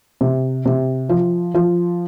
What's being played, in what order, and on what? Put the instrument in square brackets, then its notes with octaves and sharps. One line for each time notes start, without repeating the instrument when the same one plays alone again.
[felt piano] C3
C3
F3
F3